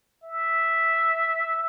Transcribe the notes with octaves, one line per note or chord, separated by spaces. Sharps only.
E5